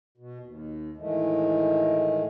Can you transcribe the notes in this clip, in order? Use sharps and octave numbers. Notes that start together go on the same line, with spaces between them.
B2
D#2
A2 D#3 E3 G#3 A3